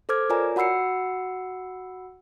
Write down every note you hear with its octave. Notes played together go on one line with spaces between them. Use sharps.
A4 C5 D6 F6 G#6
F4 A#4 C#5 D5 G#5 A#5
F#4 F#5 B5 E6 C7 C#7